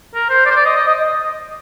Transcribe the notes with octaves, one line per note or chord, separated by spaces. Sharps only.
A#4
C5
D5
C5
D5
D#5
D#5
D#5